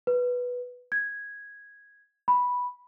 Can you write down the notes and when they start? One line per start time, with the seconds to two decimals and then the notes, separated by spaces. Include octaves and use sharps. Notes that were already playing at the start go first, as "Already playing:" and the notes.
0.07 B4
0.92 G#6
2.28 B5